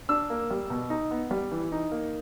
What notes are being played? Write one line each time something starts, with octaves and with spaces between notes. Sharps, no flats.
D4 E6
A#3
G3
B2
D#4
B3
G3
E3
D#4
A#3